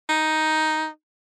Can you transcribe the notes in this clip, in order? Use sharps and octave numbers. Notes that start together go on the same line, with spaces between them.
D#4